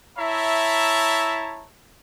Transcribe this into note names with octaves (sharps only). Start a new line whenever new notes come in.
E4 C#5 E5 A5 A#5